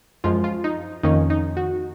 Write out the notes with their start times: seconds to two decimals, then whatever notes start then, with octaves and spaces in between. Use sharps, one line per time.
0.24 F#2 F3 G#3 F4
0.44 F4
0.64 D#4
1.03 F2 D#3 A#3 C#4 D#4
1.30 D#4
1.57 F#4